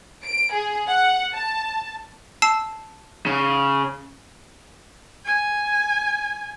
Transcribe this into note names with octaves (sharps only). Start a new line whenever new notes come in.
D7
G#4
F#5
A5
A5 E6 C7
C#3
G#5